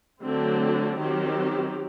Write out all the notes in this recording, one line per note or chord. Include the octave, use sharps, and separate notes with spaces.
D3 F#3 A3 C4
D#3 F#3 C4 G4